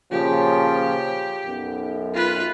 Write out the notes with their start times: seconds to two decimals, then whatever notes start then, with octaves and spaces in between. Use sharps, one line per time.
0.12 A#2 C#3 F3 G4
1.45 B1 F#2
2.14 F4 B4